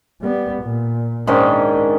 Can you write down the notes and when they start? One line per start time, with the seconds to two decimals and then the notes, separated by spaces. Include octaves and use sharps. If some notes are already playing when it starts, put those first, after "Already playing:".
0.21 G3 B3
0.62 A#2
1.27 G#2 D#3 C#4 D4